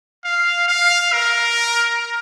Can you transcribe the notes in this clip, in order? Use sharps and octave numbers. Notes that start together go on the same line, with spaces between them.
F5
F5
A#4